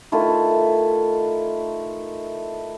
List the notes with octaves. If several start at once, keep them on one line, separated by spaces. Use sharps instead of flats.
D#3 A3 E4 F4